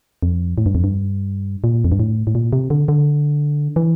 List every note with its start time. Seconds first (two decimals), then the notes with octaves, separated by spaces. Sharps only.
0.23 F2
0.58 A2
0.66 G2
0.75 F2
0.84 G2
1.64 A#2
1.84 F2
1.92 G2
2.00 A2
2.27 A2
2.35 A#2
2.53 C3
2.70 D3
2.88 D3
3.76 E3